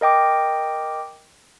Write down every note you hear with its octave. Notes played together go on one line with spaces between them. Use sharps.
A#4 D#5 G5 D6